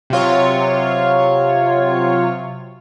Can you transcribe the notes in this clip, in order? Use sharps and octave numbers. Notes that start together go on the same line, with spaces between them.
C3 F#3 F4 C#5